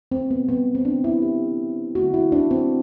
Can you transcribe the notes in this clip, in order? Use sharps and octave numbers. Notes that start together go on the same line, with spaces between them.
C4
B3
C3 G3 B3
C4
D4
E4
G4
D3 F#3 A3 F#4
E4
D4
C4